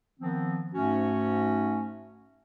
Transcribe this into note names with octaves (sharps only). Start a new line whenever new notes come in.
D#3 F3 B3 C4
G#2 A3 C#4 F#4